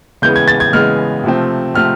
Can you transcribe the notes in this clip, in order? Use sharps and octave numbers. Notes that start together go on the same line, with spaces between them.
C#3 E3 G#3 B3 G6
G#6
A6
G#6
C#3 E3 G#3 B3 F6
C3 F3 A3 C4
C3 F3 A3 C4 F6